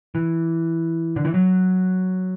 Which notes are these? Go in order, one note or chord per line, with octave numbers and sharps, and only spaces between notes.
E3
D3
E3
F#3